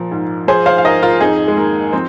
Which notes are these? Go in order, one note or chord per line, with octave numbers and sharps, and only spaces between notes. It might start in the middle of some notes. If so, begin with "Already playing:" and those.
Already playing: A#2 F3
G#2
F3 G#4 C5
C5 F5
F5
G#2 A#4 D#5
F4 A#4
F2 D#4 G#4
G#3
D#3 A#3
F3 C4